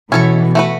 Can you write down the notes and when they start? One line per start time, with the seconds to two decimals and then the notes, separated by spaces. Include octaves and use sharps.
0.11 B2 E3 C#4 E4 A4 C#5
0.55 A3 F#4 B4